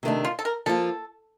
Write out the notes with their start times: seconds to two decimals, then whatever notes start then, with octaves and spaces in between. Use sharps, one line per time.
0.03 C3 D#3 A3 D4
0.25 F4
0.39 A4
0.45 A#4
0.66 F3 A#3 F4 A4